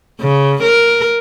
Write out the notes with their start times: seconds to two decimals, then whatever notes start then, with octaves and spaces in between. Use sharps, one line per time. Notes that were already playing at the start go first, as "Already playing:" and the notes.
0.21 C#3
0.63 A#4